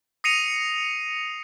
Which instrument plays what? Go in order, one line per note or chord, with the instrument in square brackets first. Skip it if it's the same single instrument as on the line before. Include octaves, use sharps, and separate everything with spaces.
[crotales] D#6 A#6 C7 C#7 D#7 F7